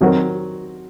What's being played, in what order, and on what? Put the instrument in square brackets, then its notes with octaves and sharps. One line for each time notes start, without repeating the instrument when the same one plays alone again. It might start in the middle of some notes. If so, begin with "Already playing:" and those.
[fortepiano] D#3 F#3 C4 F#4 A#4